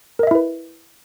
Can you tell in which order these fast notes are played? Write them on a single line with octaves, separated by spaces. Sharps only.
A#4 D#5 E5 E4 B4